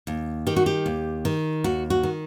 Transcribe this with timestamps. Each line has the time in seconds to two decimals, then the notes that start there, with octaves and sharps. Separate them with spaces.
0.07 D#2
0.47 D#3 G4
0.56 F#4
0.66 G4
0.86 D#2
1.25 D#3
1.64 D#2 F#4
1.90 F#4
2.03 D#3